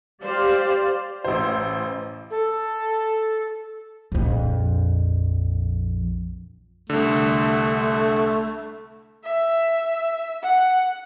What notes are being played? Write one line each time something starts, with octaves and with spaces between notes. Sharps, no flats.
G4 C5 D5 F5
A1 C5
A4
A#1 F2
C2 D3 A3
E5
F#5